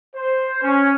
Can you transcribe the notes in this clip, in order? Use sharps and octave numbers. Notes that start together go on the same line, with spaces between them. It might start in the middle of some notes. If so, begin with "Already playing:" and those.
C5
C#4